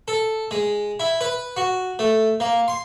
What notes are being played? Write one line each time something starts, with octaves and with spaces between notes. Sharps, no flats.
A4
G#3
E4
B4
F#4
A3
A#3
C6